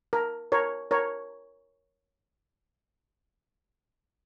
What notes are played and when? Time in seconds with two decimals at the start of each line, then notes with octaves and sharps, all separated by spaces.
0.13 A#4
0.52 A#4 C#5
0.91 A#4 C#5